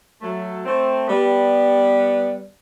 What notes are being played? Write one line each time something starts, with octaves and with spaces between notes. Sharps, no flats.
F#3 A3
A3 C4
G3 B3